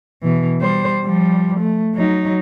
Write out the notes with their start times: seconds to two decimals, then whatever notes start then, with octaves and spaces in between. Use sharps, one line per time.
0.23 B2 E3
0.61 G3 C5
1.04 F3 G3
1.60 A3
1.94 F#3 D#4